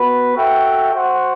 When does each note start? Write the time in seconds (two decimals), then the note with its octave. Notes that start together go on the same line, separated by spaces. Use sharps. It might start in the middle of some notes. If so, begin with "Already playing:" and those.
Already playing: B3 F#4 B4
0.35 F#4 A4 E5 G5
0.92 F#4 C5 F#5